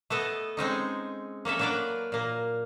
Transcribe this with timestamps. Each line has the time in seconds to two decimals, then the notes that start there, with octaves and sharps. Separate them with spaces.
0.10 A3 B3 A4 D#5
0.57 G#3 C4 C#4 D#4
1.45 A#3 C#4 A4 E5
1.59 F#3 A#3 D4 B4 D5
2.12 A#2 A#3